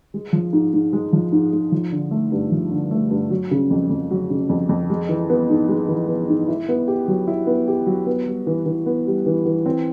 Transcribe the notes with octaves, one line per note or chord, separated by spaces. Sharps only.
G#3
F3
G#2
G#2
G#3
F3
G#2
G#2
F3
D3
A3
G2
F3
D3
A3
G2
F#3
C#3
F2
F2
F#3
C#3
F2
F2
G#3
E3
B3
G#2
G#3
E3
B3
G#2
E4
B3
G4
F#3
E4
B3
G4
F#3
B3
G3
E3
E3
B3
G3
E3
E3
C4